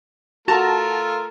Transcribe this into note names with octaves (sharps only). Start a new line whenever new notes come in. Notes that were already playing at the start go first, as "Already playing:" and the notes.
A3 F4 F#4 A#4 A5 A#5